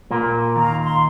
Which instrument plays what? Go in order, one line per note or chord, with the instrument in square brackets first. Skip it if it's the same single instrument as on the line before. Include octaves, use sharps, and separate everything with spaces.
[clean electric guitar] A#2 A#3
[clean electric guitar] D#2 [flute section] F5 A#5
[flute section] C6